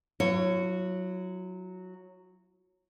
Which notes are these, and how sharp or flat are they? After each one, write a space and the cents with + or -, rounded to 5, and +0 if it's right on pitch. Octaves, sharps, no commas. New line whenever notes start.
F#3 -5 E4 +40 C#5 +0